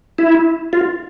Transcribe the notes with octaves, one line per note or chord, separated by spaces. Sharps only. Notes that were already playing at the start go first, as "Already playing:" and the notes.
E4
F4